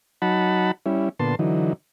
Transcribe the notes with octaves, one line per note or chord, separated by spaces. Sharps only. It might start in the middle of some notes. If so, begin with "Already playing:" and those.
F#3 D#4 F#5 A5 B5
G3 C#4 E4
A#2 D3 B3 A5 C6
D3 E3 F#3 D#4